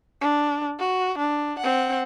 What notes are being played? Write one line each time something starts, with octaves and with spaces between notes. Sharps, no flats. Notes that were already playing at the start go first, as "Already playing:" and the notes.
D4
F#4
D4
C4 F#5